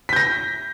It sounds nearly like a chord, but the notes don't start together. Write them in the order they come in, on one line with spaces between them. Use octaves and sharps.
B6 G6 A#6